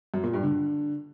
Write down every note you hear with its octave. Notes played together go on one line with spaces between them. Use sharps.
F#2
A#2
G2
D3